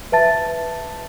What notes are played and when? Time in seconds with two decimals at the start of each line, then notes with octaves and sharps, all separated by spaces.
0.12 B4 E5 A5 A6